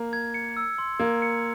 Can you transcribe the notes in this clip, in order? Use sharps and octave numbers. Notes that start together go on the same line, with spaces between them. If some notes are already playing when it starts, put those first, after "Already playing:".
Already playing: A#3
G#6
C#7
E6
C6
A#3 G#6
C#7